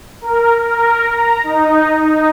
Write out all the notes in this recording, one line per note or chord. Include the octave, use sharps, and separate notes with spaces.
A#4
A#4
A#5
D#4
D#4